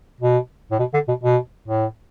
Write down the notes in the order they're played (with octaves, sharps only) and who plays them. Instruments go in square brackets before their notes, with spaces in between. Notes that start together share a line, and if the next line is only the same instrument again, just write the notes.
[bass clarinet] B2
A2
B2
D3
B2
B2
A2